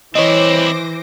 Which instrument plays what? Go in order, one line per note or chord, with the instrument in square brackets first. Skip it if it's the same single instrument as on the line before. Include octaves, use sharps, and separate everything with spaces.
[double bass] E3 [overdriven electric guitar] C4 E4 [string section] C5 D6 A#6 [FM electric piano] C#5 D#5